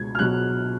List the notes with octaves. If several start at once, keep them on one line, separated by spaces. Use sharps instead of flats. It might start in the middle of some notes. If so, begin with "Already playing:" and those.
Already playing: C#2 B2 G#6
F6
B2 F#3 F#6